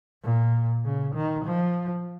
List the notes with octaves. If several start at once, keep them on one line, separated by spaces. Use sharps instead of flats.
A#2
C#3
D#3
F3